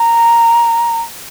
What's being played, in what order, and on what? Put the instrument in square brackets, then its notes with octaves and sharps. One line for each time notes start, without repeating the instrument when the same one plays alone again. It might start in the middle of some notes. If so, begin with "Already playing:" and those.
Already playing: [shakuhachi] A#5